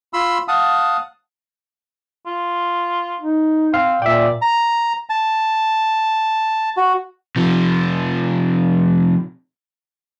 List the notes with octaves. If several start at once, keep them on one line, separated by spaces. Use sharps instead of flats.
F4 B5 C6 E6
F5 F#5 A5 D#6
F4
D#4
C4 F5
A#2 D5 E5 G5
A#5
A5
F#4
C3 F3